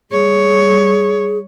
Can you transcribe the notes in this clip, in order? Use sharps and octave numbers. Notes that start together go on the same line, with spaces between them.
G3 G#4 C#5